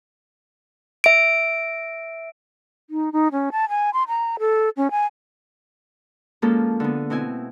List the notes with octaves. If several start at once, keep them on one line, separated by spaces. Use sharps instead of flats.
E5 D7
D#4
D#4
C#4
A5
G#5
C6
A#5
A4
C#4
G#5
F3 G#3 A#3 C#4 F4 A4
D3 B3
B2 C4 E4 G#5